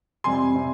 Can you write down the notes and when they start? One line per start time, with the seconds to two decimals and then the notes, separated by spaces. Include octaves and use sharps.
0.24 F2 C3 G3 C4 G#5 C6
0.55 C3 G3 C4